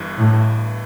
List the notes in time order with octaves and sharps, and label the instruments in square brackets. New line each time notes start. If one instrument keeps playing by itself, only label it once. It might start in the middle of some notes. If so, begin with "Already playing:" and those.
Already playing: [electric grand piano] G1 G2 E3
[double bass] A2